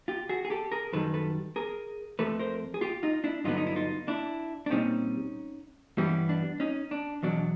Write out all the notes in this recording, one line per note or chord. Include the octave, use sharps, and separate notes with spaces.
F4 G4
F#4 G#4
G#4
G4 A4
G#4 A#4
F#2 D#3 G3 A4 B4
A4 B4
G#4 A#4
F2 C3 F3 A3 A4 B4
A#4 C5
G#4
F4 G4
D#4 F4
D4 E4
G2 D3 F#3 B3 D#4 F4
D#4
E4
D#4 F4
D4 E4
D4
A#2 G3 C4 C#4 D#4
G2 E3 G3 B3 C#4
D4
C#4 D#4
D4
E2 B2 F#3 D4